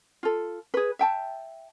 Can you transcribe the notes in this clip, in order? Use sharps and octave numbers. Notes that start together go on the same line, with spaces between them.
F4 A4
G#4 B4
E5 G5 A5